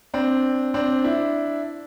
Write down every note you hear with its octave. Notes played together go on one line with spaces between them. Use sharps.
C4 D4
C4 D4
D4 E4